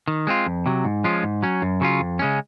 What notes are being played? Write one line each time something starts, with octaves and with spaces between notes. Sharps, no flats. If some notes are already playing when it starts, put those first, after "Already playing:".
D#3
G#3 C4 F4
F2
C3 F#3
G#2
F3 G#3 C#4 F4
G#2
F#3 C#4
F#2
C#3 F#3 C#4 F4
F2
C#3 G#3 C#4